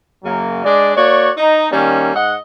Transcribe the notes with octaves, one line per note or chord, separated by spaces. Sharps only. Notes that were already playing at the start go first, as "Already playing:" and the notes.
F#2 C#3 F#3 A#3
G#3 D4 D5
A#3 F#4 C#5 D5
D#4
D#3 G3 A#3 C#4
G#2 D#5 F#5